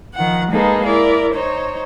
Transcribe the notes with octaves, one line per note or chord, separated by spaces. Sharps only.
D#3 F3 F#5
G#3 A#3 D#4 G#4 A4 B4
E4 A#4 D5
D#4 C5 C#5